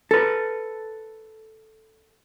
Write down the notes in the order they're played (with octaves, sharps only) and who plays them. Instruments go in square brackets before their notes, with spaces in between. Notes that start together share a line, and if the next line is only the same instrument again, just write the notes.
[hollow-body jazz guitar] A4 B4